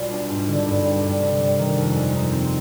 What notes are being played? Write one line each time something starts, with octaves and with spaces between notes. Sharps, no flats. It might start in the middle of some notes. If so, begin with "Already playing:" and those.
Already playing: B1 B2 G3 F4
D4
G#2
D3
G2
G3
G2
C3
G3
D#3
F2
G#3
D#4
C4